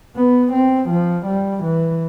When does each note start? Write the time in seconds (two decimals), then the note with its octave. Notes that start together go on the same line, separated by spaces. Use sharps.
0.16 B3
0.53 C4
0.90 F3
1.27 G3
1.63 E3